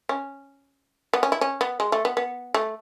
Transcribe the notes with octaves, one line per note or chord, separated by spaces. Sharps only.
C#4
B3
C#4
E4
C#4
B3
G#3
A3
B3
B3
A3